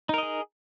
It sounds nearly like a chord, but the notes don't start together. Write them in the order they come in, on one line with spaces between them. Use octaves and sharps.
D#4 A#4 D#5 G#4